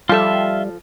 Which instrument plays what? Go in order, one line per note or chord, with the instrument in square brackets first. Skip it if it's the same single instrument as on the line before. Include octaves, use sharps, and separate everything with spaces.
[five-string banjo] F3 A4 [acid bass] G3 [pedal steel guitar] F4 E5